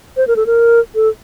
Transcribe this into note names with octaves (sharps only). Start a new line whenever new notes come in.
C5
A#4
A4
A#4
A4